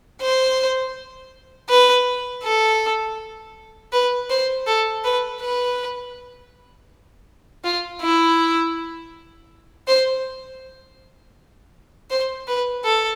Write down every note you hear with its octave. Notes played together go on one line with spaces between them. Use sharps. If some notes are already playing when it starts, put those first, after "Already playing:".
C5
B4
A4
B4
C5
A4
B4
B4
F4
E4
C5
C5
B4
A4